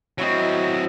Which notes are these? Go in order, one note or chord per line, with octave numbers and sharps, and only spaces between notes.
F#3 C4 E4 F#4 D#5